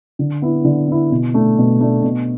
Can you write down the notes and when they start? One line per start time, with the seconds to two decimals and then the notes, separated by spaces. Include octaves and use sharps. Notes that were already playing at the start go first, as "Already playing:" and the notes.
0.19 D3
0.42 B3 E4
0.65 D3
0.88 B3 E4
1.12 B2
1.34 A3 D4
1.58 B2
1.81 A3 D4
2.03 B2